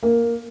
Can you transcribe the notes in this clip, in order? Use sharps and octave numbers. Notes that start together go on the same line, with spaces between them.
A#3